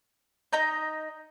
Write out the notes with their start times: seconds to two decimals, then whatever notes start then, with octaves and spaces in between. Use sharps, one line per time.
0.53 D#4 D#5 A#5 G6